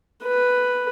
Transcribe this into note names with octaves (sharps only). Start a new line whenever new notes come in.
B4